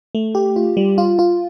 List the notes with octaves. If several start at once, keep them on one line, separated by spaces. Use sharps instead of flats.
A3
G4
F4
G3
F4
F4